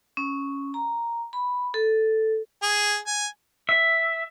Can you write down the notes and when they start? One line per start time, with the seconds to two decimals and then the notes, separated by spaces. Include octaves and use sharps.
0.17 C#4
0.74 A#5
1.33 B5
1.74 A4
2.63 G#4
3.07 G#5
3.69 E5